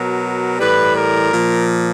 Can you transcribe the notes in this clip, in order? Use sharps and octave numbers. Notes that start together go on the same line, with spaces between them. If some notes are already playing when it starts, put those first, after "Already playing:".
Already playing: B2 F#3 A#4
A2 E3 G3 B4
A#4
A#2 F3